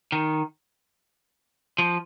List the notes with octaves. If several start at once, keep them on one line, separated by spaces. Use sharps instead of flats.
D#3
F3